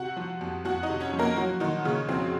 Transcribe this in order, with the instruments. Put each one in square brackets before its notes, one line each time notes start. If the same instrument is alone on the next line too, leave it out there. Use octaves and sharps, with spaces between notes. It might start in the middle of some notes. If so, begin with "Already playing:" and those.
Already playing: [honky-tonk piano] C3 F#4 F#5
F3
F2
F2 F#4 F#5
D#4 D#5
C3
C#4 C#5
F3
A#3 A#4
F3 F#3 F#4
A#2 D#3 D#4
A#2 C#3 C#4
F3 C4